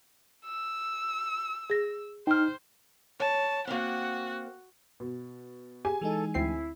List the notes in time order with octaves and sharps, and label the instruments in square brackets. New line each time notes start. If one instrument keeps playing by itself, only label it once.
[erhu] E6
[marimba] G#4 A#6
[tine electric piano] D#4 [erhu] C5 [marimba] G5 F6
[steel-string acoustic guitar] C#5 [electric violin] A5
[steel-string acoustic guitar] A#3 C4 [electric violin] F#4 F#5
[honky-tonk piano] B2
[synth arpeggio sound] G4 [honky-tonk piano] G#4 G#5
[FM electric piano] E3 G#3 D#4 [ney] A4
[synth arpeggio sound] D2 C4 C7 [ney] E4